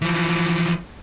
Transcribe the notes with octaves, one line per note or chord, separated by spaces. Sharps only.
E3 F3